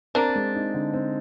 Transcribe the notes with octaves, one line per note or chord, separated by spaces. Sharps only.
A#3 C4 D4
G#3
D#4
D3
C4